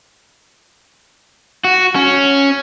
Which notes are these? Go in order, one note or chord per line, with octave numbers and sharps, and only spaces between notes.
F#4
C#4